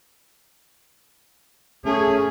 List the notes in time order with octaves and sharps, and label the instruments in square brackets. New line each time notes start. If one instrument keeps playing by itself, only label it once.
[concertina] A3 [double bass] C#4 [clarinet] G#4